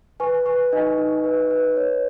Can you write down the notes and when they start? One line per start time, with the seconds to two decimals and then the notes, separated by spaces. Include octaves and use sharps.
0.20 B4 G#5 C#6
0.46 B4 G#5 C#6
0.72 D#4 D#5 G#5
0.98 D#4
1.24 B4
1.50 B4
1.77 C#5